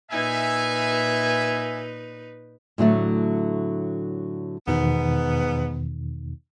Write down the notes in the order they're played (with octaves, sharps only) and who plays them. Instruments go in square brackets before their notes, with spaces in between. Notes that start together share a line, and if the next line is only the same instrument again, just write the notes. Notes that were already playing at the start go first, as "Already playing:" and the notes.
[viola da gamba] A#2 D#4 B4 [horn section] E5 G#5
[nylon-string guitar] A2 D3 F#3 A3
[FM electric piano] E2 B2 D#3 [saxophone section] G#2 B3